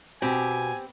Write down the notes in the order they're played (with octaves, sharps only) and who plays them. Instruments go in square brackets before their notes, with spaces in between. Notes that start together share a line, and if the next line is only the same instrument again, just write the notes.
[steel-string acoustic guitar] B2 [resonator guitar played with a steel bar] C4 G4 [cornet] G#5